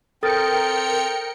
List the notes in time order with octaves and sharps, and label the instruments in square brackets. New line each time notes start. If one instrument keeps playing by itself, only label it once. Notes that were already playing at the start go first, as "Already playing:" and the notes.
[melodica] C4 [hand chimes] A4 D#6 A6 [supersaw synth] A#4 G5 C#7